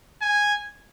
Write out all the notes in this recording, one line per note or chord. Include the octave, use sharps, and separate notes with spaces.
G#5